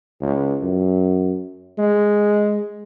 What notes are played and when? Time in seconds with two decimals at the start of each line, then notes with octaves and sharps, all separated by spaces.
0.22 C#2
0.62 F#2
1.78 G#3